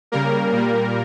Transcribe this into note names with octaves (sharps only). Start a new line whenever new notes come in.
C#3 G3 A#3 A#4
A#2 G3 A#3